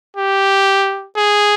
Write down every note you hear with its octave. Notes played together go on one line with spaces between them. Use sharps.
G4
G#4